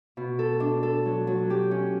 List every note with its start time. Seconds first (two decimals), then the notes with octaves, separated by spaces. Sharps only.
0.17 B2
0.39 A4
0.60 D4
0.83 A4
1.05 F#3
1.27 F#3
1.50 G4
1.71 C#4